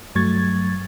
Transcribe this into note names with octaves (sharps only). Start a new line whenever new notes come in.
G2 F#3 A3 C#6 G#6 A6